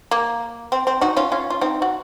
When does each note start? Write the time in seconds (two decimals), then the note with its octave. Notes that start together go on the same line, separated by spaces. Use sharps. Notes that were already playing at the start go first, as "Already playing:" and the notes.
0.11 A#3
0.72 C4
0.87 C4
1.01 D#4 F#4
1.17 C#4 F4
1.32 C#4 F4
1.50 F4
1.61 C4 D#4
1.82 F#4